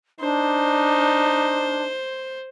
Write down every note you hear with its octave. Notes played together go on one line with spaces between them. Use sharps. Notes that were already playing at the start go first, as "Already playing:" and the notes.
D4 D#4 C5